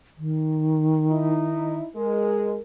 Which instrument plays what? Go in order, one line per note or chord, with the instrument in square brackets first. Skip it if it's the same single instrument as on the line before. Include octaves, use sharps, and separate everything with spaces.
[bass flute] D#3
[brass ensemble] D#4 E4
[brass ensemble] G#3 [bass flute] A#4